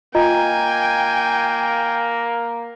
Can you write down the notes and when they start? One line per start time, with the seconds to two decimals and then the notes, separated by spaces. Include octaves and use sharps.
0.15 A#3 F4 D#5 G5 G#5 A#5